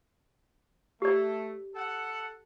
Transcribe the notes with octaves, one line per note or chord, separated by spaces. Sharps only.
A3 G4 D5
A4 F#5